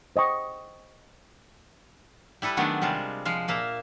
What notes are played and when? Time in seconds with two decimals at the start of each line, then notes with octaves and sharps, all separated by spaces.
0.16 C5 D#5 G5 C#6
2.42 G3 E4 A4 B4
2.57 D#3 F#3 G#3 A3 B3 D4
2.82 C3 G3 G#3 F4 A5
3.25 F3 G#3 F5
3.48 A#2 A#3 E5 F5